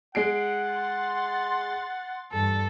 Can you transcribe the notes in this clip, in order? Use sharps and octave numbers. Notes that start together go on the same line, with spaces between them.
G#3 F#5 C7 D7
C6 A6
E2 G2 A4